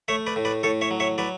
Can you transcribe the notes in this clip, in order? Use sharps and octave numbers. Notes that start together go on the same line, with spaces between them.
A3 C#5 E5
B4 D5
A2
B4 D5
A2 A4 C#5
C#5 E5
F#3
C#5 E5
F#3 B4 D5